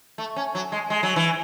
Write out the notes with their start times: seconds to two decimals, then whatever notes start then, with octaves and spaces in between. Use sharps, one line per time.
0.18 A3
0.36 C#4
0.55 F#3
0.72 G#3
0.90 G#3
1.03 F#3
1.16 E3